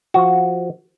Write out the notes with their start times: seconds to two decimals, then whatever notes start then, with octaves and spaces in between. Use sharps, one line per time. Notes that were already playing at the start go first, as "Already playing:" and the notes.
0.14 F3 F#4